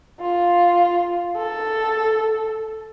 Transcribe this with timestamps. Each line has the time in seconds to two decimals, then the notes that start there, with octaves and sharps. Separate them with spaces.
0.21 F4
1.38 A4